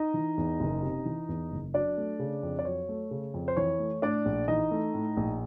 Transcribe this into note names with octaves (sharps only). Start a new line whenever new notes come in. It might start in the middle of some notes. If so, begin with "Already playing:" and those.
Already playing: D#4 D#5
E3
E2
F#1
C3
E3
E2
F#1
F#3 D4 D5
A3
C#3
F2
D5
F#3 C#5
A3
C#3
F2
C5
E3 C#5
A3
A2 D4 D5
A#1
E3 D#4 D#5
A3
A2
A#1